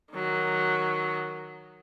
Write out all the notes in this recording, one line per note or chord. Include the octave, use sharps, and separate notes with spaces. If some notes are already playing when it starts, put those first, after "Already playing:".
D#3 F#3